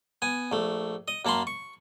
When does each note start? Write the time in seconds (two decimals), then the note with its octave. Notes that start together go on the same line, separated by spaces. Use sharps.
0.22 B3 G#5
0.52 A#1 A3
1.08 D#5
1.25 F#2 A#3 A5 B5 C6
1.47 C#6